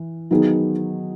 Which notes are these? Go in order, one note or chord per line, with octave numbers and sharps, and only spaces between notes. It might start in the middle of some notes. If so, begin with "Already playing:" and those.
Already playing: E3
D#3 F#3 B3 D#4 G#4